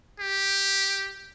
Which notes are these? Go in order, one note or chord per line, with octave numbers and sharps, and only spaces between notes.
G4